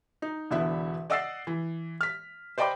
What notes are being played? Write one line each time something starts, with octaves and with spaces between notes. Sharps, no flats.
D#4
E1 D3 B3 E4 E5
D5 D#5 F#5 E6 A6 C7
E3
F6 B6
C5 D5 D#5 G5 B5 D6